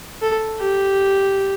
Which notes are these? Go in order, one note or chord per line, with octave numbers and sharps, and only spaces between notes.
A4
G4